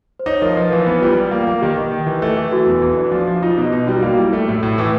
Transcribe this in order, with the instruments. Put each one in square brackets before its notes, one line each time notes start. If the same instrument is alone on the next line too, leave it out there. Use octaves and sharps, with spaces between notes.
[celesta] C5
[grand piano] D#4 [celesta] C#5
[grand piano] F3 [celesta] A#4
[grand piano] F3 [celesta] B4
[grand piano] E3
B3
[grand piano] G3 [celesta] F4
[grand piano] G3
A#3
A#3
[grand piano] D#3 [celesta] G4
[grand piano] D#3
D#3
E3
A3
E3
[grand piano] E3 [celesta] F#4
[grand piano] E2
E3
D4
F3
F3
[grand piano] D#4 [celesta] F4
[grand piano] B2
D#4
[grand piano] G3 [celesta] F#4
[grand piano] A#3 [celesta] F#4
[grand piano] G3 [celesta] E4
[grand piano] A3
A2
A2
E3